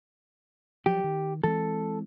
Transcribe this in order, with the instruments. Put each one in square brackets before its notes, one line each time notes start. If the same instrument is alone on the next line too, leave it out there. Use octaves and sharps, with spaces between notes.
[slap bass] F3 F#3 [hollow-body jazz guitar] G4
[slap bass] D#3
[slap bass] E3 G#3 C4 [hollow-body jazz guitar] A4